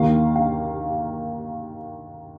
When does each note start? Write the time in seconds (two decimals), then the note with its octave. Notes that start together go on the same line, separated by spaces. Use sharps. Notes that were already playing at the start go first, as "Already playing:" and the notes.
Already playing: D#2 D#3 A#3 F5
0.36 F5